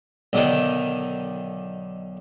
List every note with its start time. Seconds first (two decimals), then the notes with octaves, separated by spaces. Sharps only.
0.33 B1 D3 D#3